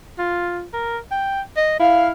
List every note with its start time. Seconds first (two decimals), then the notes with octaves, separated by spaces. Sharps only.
0.19 F4
0.73 A#4
1.11 G5
1.57 D#5
1.79 E4 F5